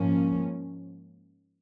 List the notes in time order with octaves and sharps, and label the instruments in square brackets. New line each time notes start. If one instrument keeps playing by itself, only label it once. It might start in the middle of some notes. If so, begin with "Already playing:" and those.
Already playing: [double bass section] G#2 F3 A#3 C#4